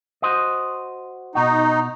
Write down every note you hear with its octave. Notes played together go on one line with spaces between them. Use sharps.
F#4 C5 D#5
B2 D#4 F#4